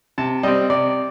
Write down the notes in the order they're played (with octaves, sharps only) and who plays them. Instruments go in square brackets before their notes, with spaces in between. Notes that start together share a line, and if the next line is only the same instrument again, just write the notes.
[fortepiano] C3 A5
G3 C4 D#5
C3 D5